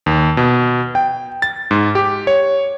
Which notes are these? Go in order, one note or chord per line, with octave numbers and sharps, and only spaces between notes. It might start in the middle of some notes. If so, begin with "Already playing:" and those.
D#2
B2
G5
A6
G#2
G4
C#5